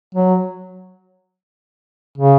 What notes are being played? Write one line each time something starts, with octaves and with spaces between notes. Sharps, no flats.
F#3
C#3